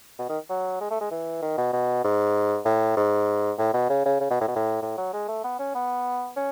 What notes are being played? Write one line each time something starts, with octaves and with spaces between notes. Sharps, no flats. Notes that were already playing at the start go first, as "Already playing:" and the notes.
B2
D#3
F#3
G#3
A3
G#3
E3
D#3
B2
B2
G#2
A2
G#2
A2
B2
C#3
C#3
C#3
B2
A2
B2
A2
A2
F#3
G#3
A3
B3
C#4
B3
C#4